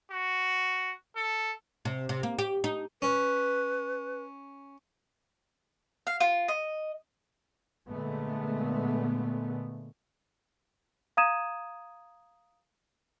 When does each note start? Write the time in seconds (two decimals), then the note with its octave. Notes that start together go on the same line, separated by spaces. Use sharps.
0.11 F#4
1.16 A4
1.85 C3
2.09 C3
2.23 A#3
2.39 G4
2.64 D#4
3.02 C#4 B4
6.07 F5
6.20 F4
6.48 D#5
7.89 A#2 D3 G#3 A3 B3
11.17 F5 A#5 D#6 G#6 D#7 E7